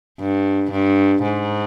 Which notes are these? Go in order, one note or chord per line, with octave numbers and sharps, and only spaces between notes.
G2
G2
G#2